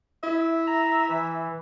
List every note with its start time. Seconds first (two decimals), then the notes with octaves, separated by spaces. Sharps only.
0.23 E4 E5
0.67 A#5
1.09 E3